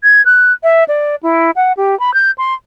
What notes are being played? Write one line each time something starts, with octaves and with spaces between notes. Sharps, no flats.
G#6
F#6
E5
D5
E4
F#5
G4
B5
G6
C6